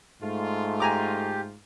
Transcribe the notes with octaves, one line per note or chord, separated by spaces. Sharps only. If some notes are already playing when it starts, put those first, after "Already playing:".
G#2 A3 F4
G4 G#5 A#5 D6